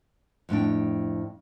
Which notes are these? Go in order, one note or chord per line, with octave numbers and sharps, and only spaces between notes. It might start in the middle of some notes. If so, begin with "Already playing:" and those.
F2 A2 D4 G5